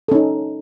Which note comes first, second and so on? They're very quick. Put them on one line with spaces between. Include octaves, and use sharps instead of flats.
A4 C#4 D#4